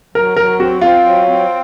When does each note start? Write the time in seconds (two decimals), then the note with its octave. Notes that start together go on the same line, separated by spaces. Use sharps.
0.15 F#3 A#4
0.37 F#3 A#4
0.60 C4 F#4
0.81 C4 F4
1.05 F#3
1.27 C4